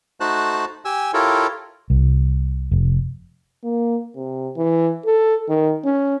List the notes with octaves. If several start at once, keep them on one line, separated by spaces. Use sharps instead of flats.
A3 D#4 F#4 C5 A5 F#6
G4 G#5 E6
E4 F4 G4 A4 A#4 C#5
C2
F1
A#3
C3
E3
A4
D#3
C#4